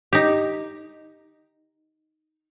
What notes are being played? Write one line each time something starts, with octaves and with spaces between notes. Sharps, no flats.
D#4 G4